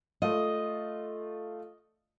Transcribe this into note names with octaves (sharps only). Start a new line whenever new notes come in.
A3 F4 D#5